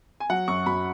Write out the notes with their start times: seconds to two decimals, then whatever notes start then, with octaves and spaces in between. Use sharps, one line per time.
0.20 G#5
0.30 F#3 F#5
0.48 F#2 C#6
0.66 F#2 B5